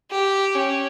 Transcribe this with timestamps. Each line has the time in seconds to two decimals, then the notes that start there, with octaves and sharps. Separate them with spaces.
0.11 G4
0.54 C#4